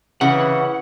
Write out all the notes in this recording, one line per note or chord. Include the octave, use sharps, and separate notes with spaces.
C#3 E3 F#5